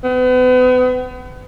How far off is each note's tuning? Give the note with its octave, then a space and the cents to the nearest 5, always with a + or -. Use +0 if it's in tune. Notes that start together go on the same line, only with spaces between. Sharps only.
B3 +35